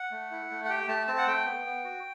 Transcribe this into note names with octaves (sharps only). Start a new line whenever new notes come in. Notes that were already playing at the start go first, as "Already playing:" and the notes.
Already playing: F#5
A3
E4
A3
F#5
G4 G5
A3 A5
C4 A5
F#5
A3 G5
B3
B3
F#4